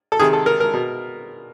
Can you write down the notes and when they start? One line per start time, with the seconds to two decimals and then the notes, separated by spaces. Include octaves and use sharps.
0.12 A4
0.19 C3 D#3 G#4
0.33 A4
0.46 A#4
0.60 A#4
0.74 B2